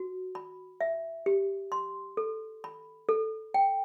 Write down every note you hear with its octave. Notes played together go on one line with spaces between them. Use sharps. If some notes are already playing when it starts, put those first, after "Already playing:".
Already playing: F#4
B5
E5
G4
C6
A4
B5
A4
G5